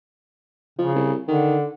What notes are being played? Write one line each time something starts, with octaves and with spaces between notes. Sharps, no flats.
C#3 F3
C2
D3 D#3